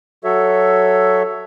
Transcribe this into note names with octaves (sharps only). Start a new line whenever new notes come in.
F#3 F#4 A4 C#5 E5